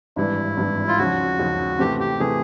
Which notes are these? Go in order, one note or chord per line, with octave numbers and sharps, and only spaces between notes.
G#1 G2 E3 G3 E4
G#1 G2 E3 G3
F4
D#2 C#3 F3 F#4
D#2 C#3 F3
C3 E3 A3 C4 G4
G4
C3 E3 A3 C4 G#4